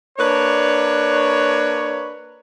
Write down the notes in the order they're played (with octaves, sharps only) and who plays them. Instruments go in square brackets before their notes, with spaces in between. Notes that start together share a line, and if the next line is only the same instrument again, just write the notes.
[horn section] A#3 D4 B4 C#5